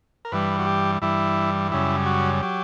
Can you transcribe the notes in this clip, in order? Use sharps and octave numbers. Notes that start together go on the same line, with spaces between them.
A#4
G2 E3 G3 B4
F#4
G4
G2 E3 G3 E4
F#2 C#3 G3 E4
F#4
F#3 G4